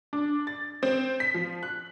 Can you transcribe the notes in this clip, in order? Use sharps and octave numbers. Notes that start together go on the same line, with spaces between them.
D4
A6
C4
B6
F3
F#6